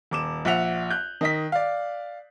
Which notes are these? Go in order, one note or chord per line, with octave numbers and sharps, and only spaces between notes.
D#1 D6 E7
A#1 E5 F#5 F7
F#6 G6
D#3 D#5 B6
D5 F5